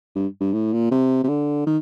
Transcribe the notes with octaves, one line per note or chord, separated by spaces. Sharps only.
G2
G2
A2
A#2
C3
C3
D3
D#3